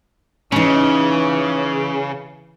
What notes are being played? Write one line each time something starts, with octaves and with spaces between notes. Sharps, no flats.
C#3 E3 C#4 D#4